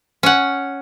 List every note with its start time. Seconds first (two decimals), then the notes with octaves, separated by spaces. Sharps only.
0.23 C#4 F#5